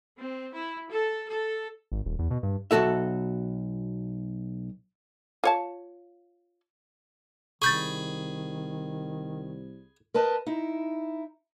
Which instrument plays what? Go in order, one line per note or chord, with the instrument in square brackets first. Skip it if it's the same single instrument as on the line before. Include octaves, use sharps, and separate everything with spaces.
[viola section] C4
E4
A4
A4
[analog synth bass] G#1
D#1
E2
B2
G2
[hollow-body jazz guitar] B1 F2 F#4 A4 E5
[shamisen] F4 C#5 A5
[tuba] C2 [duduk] D#3 [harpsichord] G#4 B5 [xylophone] C#6 G6 A6
[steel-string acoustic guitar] A#4 B4 D#5 A5
D#4 E4